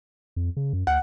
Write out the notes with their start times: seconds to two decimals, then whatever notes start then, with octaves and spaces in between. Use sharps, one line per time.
0.36 F2
0.57 C#3
0.73 F#2
0.87 D2 F#5